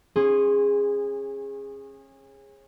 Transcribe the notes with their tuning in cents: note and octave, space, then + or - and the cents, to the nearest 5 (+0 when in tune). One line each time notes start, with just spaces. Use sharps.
C#4 -35 G#4 -15 C6 +0